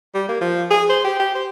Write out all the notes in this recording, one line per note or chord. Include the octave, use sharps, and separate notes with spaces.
G3
A#3
F3
G#4
C5
G4
G4
C5